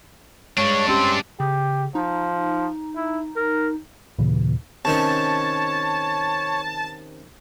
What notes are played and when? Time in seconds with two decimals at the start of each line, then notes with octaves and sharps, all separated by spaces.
0.57 G2 G#3 D4 C#5
0.88 C4 C#4 G4
1.40 C#3 G4
1.95 F3 D#4
2.96 E4
3.36 A#4
4.19 D#2 A#2 C#3 E3
4.85 C3 D#3 C#4 C#5 A5